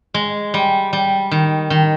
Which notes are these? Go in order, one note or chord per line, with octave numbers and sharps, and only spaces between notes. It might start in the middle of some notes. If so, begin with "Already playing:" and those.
G#3
G3
G3
D#3
D#3